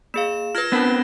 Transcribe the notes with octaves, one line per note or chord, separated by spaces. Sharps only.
A#3 G#4 F5 E7
F4 B4 F6 G#6 A#6
B3 C4 D4 A#4 B4 A5